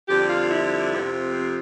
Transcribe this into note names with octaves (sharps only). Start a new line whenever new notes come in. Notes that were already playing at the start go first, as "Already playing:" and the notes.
F2 D3 G3 G4
F4
E4
F2 C3 F3
C4